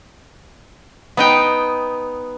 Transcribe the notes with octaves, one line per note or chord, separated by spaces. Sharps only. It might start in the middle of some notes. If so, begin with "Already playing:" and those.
B3 D#4 G5